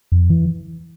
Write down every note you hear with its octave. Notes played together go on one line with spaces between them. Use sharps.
F2
E3